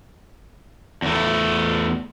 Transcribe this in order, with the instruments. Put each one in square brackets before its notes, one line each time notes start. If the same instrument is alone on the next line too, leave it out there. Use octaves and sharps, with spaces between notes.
[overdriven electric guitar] E2 A3